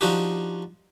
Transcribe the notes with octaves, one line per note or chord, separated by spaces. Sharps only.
F3 D4 D#4 F#4 G4